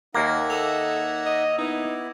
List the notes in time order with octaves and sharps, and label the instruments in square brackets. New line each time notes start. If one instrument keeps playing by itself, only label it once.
[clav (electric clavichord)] D#2 A#3 [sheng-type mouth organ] D#4 E5 F#5 [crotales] G#6 A#6
[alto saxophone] A4 [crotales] D6 E6 F7
[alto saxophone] D#5
[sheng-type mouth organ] B3 E4 [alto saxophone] D#4